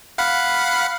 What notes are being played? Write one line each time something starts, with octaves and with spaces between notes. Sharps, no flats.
F5 F#5 B5